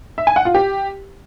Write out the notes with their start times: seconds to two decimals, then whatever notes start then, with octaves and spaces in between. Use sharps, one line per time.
0.18 E5
0.27 G#5
0.36 F#5
0.45 F4
0.54 G4